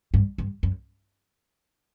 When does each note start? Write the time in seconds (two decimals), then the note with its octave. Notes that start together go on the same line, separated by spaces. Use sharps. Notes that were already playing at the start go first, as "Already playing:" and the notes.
0.14 G2
0.38 G2
0.63 F#2